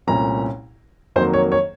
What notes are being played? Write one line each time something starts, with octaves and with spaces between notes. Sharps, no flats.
C2 A#2 A3 C#4 A#5
F2 D#3 F#3 A#3 C5
C#5
C#5